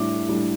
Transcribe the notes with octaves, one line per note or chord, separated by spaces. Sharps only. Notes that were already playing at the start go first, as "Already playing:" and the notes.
Already playing: A2 G3 D4 D6
A2 G3 D4